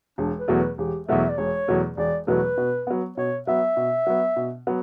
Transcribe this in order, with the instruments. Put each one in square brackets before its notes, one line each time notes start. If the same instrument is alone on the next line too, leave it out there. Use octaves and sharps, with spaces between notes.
[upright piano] E1 [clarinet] D4
[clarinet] B4
[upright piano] E2 B2 F#3 A3
[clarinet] B4
[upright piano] E1 [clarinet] G4
[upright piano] E2 B2 F#3 A3 [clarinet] E5
[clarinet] D5
[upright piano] E1 [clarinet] C#5
[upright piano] E2 B2 F#3 A3
[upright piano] E1 [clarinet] D5
[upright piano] E2 B2 F#3 A3 [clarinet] B4
[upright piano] B2
F#3 B3
[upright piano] B2 [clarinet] C#5
[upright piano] F#3 B3 [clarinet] E5
[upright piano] B2
F#3 B3
B2
F#3 B3